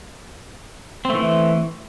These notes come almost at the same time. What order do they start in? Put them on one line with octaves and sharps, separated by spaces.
C4 A3 E3